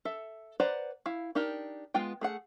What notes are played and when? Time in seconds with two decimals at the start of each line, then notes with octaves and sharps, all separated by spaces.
0.05 A4 E5
0.60 B4 C5 D5 F#5 A#5
1.06 E4 F5
1.35 D4 D#4 G4 A#4
1.94 G#3 B3 F4 G5
2.21 A3 G#4 F#5